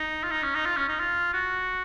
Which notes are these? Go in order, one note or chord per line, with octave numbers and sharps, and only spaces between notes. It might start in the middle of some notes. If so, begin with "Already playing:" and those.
Already playing: D#4
F4
D#4
C#4
D#4
F4
C#4
D#4
F4
F#4